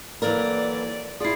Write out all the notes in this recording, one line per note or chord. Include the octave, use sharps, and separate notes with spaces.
E3 F#3 A#3 A4 A#4 D5
E4 F4 G#4 D5 C7